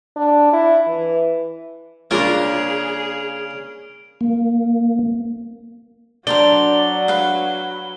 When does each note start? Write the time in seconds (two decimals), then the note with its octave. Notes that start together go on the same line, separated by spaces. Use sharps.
0.16 D4
0.53 E4
0.87 E3
2.11 C#3 A#3 D4 F4 G#4 F6 D7 F7
4.21 A#3
6.27 F#3 D4 A#4 C5 D5 G7
7.08 B4 F5